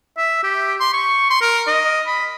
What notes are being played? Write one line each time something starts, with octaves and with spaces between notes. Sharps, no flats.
E5
G4
C6
C#6
C6
A#4
D#5
B5